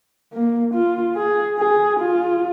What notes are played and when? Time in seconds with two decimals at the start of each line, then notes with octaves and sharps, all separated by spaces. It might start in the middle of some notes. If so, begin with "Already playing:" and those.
0.33 A#3
0.74 F4
1.16 G#4
1.59 G#4
2.00 F4